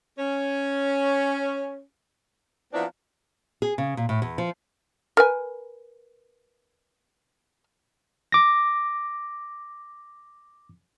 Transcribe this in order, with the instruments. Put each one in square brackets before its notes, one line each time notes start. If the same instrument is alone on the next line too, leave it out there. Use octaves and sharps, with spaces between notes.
[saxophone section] C#4
F3 F#3 B3 C4 D4 E4
[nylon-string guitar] G#4
C#3
A#2
A2
E2
F3
[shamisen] A#4 B4 G#5
[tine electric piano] D6 A#6